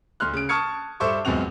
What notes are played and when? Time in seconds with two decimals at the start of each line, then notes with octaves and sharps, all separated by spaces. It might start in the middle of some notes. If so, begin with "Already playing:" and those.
0.20 D2 C6 F6 F#6
0.33 C#3 D7
0.49 A5 C#6 D#6 F6 G#6 C#7
1.00 G2 A4 C5 E5 C#6 D6
1.25 C#2 F#2 B3 C4 F#4 F7